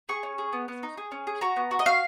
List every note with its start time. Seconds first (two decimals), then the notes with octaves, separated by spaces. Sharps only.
0.09 G#4 C#6
0.23 C#4
0.38 G#4
0.53 B3
0.68 B3
0.83 D#4
0.97 G#4
1.12 C#4
1.27 G#4
1.41 F#4 A#5
1.56 B3
1.71 F#4
1.79 D#5
1.86 F#4 F5